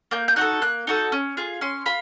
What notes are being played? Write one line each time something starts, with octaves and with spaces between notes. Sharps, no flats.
A#3 G6
G6
D#4 F#4 A4 F#6
A#3 F#6
D#4 F#4 A4
C#4
F4 G#4
C#4 C6
F4 B5